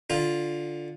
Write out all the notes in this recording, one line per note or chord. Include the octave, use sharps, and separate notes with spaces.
D3 F4